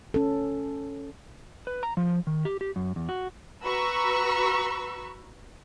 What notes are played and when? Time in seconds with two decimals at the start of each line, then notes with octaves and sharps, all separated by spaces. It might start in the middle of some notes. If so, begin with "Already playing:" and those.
0.14 C#4 A4
1.67 B4
1.83 A#5
1.97 F3
2.27 D#3
2.45 G4
2.61 G4
2.76 F#2
2.96 E2
3.09 F#4
3.63 F#4 B4 A#5 B5 C#6 E6